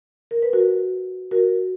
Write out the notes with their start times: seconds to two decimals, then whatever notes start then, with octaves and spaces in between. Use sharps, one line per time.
0.31 A#4
0.42 B4
0.53 F#4 A#4
1.31 F#4 A#4